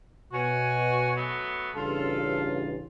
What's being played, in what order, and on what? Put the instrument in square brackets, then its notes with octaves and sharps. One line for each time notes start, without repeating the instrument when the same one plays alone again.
[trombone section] B2 [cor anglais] F#4 [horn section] C#5 G#5
[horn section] F#3 A3 B3
[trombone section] A1 G2 C#3 [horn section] F4 [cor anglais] A4